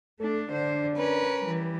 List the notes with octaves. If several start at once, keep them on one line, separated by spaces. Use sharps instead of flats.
A3 D4 A4
D3 D4 C5
C#4 A#4 B4
E3 G3